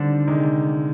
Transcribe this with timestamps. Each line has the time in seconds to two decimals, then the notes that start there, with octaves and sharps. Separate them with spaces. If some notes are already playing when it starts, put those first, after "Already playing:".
Already playing: D3 D#3 G3 C4 D4
0.28 C3 D#3 G#3